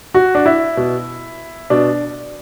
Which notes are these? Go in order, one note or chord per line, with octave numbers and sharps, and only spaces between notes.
F#4
D4
E4
B2
B2 D4